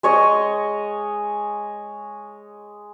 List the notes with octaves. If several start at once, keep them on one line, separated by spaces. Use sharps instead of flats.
G#3 C#5 D#5